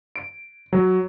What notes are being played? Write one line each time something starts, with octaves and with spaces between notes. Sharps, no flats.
D7
F#3